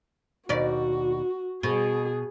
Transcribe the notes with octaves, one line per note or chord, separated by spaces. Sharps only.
D#2 B2 F#4 D5
B2 G#4